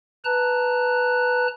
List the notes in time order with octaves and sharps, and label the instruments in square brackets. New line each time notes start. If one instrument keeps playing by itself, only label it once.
[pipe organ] B4 A5 A#5 F#6